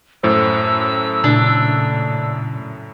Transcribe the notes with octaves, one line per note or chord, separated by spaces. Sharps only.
F#2 A2 C5 E6
A#2 C#3 A3 D4